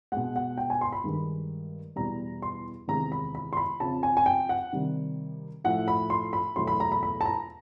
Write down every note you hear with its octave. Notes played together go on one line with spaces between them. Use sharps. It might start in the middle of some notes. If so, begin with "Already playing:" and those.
B2 G#3 F#5
F#5
G5
G#5
C6
B5
G2 D#3 G#3
E2 B2 G3 A#5
C6
E2 C3 D#3 G#3 A#5
B5
B5
C6
B5
F2 C#3 F3 A5
G#5
G#5
G5
F#5
C3 D#3 G3
A2 F3 A3 F#5
B5
C6
B5
E2 B2 F#3 A3 C6
B5
A#5
B5
B5
A5
A#5